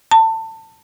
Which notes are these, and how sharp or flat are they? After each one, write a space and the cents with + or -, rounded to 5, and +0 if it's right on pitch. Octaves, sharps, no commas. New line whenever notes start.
A5 +25